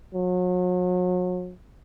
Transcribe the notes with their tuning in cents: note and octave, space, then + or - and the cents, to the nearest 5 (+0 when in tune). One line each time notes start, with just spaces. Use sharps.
F#3 -35